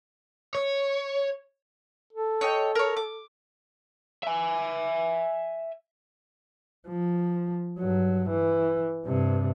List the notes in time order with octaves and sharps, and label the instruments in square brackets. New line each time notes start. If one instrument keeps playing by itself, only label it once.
[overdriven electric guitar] C#5
[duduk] A4
[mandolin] C#5 D#5 G5
A#4 C#5
D6
[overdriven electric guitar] E5 G#5
[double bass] F3
G2 F#3
E3
G2 C3